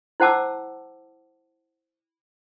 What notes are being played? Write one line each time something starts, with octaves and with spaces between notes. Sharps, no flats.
E4 C5 F#5 A5 D6 E6